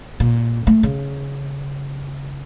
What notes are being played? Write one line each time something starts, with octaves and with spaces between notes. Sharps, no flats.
A#2
A3
C#3